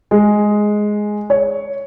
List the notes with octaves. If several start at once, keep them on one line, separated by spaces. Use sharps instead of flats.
G#3
C#5